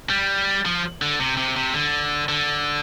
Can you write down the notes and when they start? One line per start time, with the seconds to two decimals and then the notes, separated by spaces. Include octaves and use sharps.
0.10 G3
0.65 F3
1.02 D3
1.20 C3
1.37 C3
1.56 C3
1.74 D3
2.29 D3